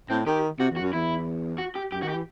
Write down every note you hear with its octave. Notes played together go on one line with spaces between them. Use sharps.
A2 C4
D#3 G4
C3 F#4
E2
F#4
F#2
E2 E4
F#4
G4
F#2 G4
D#3 F#4
G4
E3